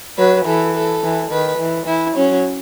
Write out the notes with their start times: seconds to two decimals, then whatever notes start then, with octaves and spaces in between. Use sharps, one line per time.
0.18 F#3 B4
0.46 E3 A4
0.74 A4
1.03 E3
1.31 D#3 B4
1.58 E3
1.87 E3 E4
2.16 F#3 C#4